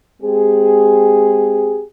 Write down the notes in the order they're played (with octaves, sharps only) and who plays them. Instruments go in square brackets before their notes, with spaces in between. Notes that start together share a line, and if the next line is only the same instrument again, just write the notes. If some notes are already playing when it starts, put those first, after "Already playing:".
[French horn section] G#3 C4 G4 G#4